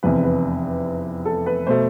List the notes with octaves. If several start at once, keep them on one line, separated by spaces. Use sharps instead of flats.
F1 E2 C3 B4
B4
A4
B4
B2 A3 C5